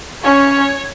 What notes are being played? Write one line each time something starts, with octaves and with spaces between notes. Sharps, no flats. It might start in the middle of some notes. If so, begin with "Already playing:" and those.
C#4 C#5